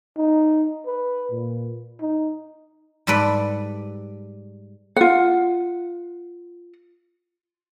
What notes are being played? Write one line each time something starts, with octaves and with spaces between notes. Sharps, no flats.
D#4
B4
A#2
D#4
G#2 G3 A4 B4 D5
F4 F#5